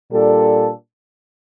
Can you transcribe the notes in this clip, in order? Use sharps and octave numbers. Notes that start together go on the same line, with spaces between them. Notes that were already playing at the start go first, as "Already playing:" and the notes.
A#2 G3 D4 A4